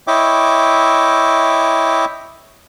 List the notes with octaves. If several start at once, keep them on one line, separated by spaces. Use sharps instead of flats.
E4 C#5 D#5 E5 G5 D6